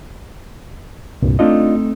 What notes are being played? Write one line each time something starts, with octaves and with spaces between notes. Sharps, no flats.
C2 G2 A#2
A3 C4 D4 D#4 F4 D#5